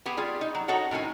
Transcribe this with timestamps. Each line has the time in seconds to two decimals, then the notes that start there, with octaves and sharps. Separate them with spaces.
0.06 B3 G4 G#4
0.17 G3 F4 G#4
0.41 D#4
0.55 F#3
0.68 D#4 F#4 A4 C#5 F#5
0.91 A2 D#3 C#4 G#5